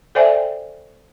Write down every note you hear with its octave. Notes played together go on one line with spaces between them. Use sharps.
A4 C5 D5 E5 G5 G#5